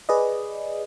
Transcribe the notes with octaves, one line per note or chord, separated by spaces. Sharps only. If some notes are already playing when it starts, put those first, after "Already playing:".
G#4 B4 D5 D#5